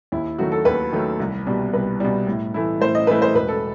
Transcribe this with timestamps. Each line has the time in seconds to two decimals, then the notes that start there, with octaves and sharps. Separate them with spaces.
0.12 D#2 E4
0.38 D#3 F#3 A3 F#4
0.52 A4
0.65 D#2 B4
0.93 D#3 F#3 A3
1.20 C2
1.47 B2 G3
1.73 C2 B4
2.00 B2 G3
2.27 A2
2.54 E3 A3 E4
2.81 A2 C5
2.95 D#5
3.07 E3 A3 E4 B4
3.22 C5
3.34 E1 B4
3.48 A4